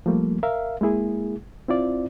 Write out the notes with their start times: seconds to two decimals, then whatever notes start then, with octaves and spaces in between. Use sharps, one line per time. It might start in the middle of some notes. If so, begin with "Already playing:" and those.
0.06 F3 G3 A3 A#3
0.43 A#4 E5 F5
0.81 G#3 A#3 E4 G#4
1.68 C4 E4 F4 D5